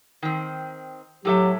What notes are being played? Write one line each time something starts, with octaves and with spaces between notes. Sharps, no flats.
D#3 C4
A2 F#3 G4 A4 E5